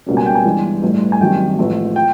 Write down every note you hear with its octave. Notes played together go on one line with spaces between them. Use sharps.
C#2 B2 G3 A#3 C#4
G#5
G5
G#5
G1 G2 E3 G#3
A1 G2 E3 A3
G#5
G#1 F#2 D#3 G3 G5
A1 G#2 F3 A3
G5